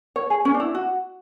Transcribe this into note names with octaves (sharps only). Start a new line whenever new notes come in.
C#5
G#4
C#4
D4
E4
F#4